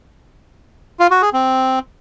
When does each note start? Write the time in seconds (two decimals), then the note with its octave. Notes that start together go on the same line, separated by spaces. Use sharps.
0.99 F4
1.11 F#4
1.22 G#4
1.33 C4